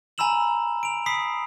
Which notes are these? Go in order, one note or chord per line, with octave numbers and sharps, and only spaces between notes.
G#5 A#5 B5 E6 E7 F#7
D7 F7
B5 D#6 B6 C7